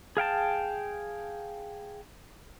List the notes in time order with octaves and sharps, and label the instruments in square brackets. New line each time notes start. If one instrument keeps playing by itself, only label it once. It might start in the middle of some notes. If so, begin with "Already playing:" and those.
[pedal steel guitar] G#4 F5 G5 A5